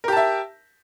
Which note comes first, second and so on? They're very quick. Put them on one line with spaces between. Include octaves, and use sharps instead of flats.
A#4 G4 A5 E5